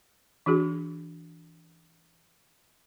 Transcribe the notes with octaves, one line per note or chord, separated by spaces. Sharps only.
E3 D4 F#4 G#4